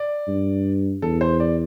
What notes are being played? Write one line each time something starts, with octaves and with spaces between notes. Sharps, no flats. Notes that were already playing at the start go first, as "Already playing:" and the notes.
Already playing: D5
G2
E2 A4
C5
D5